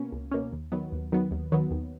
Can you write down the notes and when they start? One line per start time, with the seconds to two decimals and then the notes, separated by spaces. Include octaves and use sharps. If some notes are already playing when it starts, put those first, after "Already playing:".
Already playing: B2 A#3 C#4
0.12 C#2
0.31 B2 A#3 C#4
0.53 D#2
0.72 D#3 F#3 B3
0.92 D#2
1.12 D#3 F#3 B3
1.31 D#2
1.52 D#3 F#3 B3
1.71 D#2